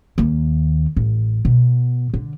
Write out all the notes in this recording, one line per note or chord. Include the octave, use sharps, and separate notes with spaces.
D#2 A#3
A1
B2
D3